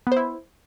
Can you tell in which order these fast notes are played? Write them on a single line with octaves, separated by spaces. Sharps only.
B3 C5 E4